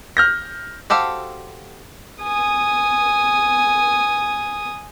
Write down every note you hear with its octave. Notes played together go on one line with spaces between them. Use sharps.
F6 G6 A#6
F#4 G4 A4 C5 F5
G#5 D#6